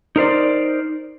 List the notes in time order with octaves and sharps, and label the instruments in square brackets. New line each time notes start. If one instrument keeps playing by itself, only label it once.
[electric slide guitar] D#4 A#4 C5 D5